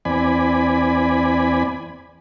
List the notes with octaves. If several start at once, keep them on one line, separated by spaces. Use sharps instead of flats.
E2 C4 D5 G#5 B5